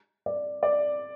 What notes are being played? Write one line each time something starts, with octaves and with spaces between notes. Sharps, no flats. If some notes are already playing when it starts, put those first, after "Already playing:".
D5
D5